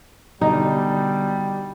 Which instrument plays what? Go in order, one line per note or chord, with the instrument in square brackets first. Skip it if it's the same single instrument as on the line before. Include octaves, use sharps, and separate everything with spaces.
[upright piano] B2 D3 D5 [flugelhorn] G3 [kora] D#4